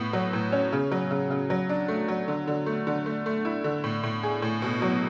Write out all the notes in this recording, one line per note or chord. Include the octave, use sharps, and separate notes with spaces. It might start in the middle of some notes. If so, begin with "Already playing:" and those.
Already playing: A2 B3
F#3
A2
C#4
C#3
F#3
C#3
C#3
F#3
D4
A3
F#3
D3
D3
A3
D3
A3
A3
E4
D3
A2
A2
G#4
A2
B2
F#3